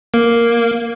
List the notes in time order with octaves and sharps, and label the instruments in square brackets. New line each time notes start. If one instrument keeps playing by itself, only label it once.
[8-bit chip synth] A#3